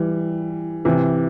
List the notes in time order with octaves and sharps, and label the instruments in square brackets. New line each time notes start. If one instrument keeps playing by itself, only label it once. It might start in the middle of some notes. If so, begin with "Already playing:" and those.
Already playing: [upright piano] E3 G3
C3 E3